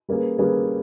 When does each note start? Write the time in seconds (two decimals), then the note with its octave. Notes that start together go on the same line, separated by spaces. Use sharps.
0.09 G3 A#3 C#4 G#4 B4
0.38 G3 A#3 C#4 G#4 B4